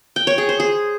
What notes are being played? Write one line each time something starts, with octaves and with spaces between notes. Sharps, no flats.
G5
C#5
G#4
C5
G#4